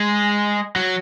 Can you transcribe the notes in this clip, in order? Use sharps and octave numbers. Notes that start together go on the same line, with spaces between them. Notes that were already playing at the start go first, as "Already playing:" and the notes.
Already playing: G#3
F#3